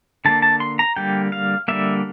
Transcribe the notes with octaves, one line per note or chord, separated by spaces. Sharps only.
D3 G3 A#3 A5
A5
C6
A#5
D3 G3 A#3 G5
F5
D3 G3 A#3 E5